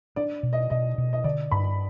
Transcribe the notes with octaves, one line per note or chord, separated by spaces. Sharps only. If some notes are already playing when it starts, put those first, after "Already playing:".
D4 D5
B2
D#5
B2 D#5
B2
D#5
D3 D5
G2 B5